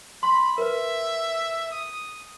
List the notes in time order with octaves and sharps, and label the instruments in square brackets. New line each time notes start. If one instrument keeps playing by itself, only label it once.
[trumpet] B5 [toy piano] C6
[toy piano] A#4 B4 [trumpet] E5
[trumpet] D#6